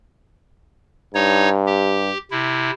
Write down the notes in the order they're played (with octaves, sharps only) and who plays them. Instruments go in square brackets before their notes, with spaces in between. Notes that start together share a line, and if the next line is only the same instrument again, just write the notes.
[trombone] G2 [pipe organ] D#4 C#5
[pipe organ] G4
C3 E4